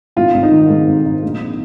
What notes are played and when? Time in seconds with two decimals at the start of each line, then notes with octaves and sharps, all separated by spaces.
0.16 G#1 F4
0.34 G#1
0.43 D#4
0.52 D#3
0.69 G#2
0.87 G#1
1.05 G#1
1.23 A#1